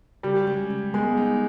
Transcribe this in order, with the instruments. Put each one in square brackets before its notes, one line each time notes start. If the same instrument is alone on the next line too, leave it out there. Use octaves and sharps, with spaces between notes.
[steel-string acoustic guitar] C#3 [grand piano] G3
[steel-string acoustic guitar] G#3
C#3
[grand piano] G#3 [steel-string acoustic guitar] B3
[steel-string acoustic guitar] D#4